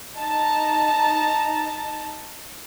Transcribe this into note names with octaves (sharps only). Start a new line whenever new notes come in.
D#4 A5 A#5